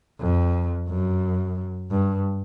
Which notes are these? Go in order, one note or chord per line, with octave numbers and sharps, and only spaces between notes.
F2
F#2
G2